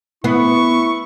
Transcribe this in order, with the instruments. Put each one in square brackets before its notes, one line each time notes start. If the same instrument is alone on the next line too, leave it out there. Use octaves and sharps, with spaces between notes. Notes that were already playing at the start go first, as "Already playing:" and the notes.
[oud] B3 [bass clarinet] E4 [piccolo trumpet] C#6